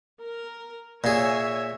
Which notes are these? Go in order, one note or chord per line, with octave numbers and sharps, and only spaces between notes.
A#4
A#2 G#4 C#5 E5 G#5